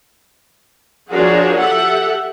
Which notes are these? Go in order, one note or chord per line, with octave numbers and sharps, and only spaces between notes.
F3 F#3 D4 F#4 G#4 A#4
G4 A4 E5 F#5